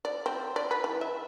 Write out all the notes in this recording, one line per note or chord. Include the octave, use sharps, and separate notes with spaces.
D5
C4
D5
B4
E3
E5